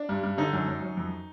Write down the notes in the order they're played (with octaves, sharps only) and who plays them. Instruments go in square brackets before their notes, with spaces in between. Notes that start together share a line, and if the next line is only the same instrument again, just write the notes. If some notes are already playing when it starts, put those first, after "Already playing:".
Already playing: [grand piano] D4
G2
G2
D3 D#4
F#2
F#2
F#2
F2